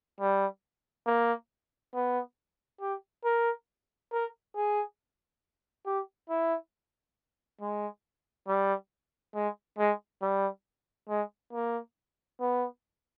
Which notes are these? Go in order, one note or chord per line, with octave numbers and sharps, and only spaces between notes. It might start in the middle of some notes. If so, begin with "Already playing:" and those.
G3
A#3
B3
G4
A#4
A#4
G#4
G4
E4
G#3
G3
G#3
G#3
G3
G#3
A#3
B3